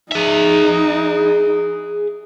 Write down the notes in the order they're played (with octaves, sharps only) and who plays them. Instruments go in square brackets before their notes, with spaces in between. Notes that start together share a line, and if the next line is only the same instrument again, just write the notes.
[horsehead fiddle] D#4 [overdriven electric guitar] G#4 E5